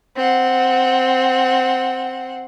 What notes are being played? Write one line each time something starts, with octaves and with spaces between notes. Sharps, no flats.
C4 F#5